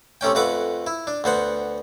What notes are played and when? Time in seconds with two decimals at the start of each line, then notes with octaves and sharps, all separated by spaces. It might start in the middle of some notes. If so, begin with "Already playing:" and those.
0.21 C3 A3 C#4 G5
0.35 F2 A3 B4 F#5 D6
0.87 E4
1.07 D4
1.24 D2 B3 C5 F#5